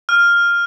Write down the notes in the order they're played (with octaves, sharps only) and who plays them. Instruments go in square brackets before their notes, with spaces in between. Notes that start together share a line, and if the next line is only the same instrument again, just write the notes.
[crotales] F6